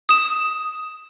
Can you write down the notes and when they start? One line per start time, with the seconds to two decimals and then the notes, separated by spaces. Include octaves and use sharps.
0.09 D#6 E7